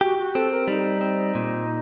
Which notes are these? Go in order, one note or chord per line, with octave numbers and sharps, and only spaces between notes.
F#4 G4
F#4
C4 A4
A#4
G3 D#4
C4
A#2